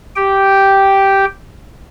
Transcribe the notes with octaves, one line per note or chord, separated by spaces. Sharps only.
G4 G5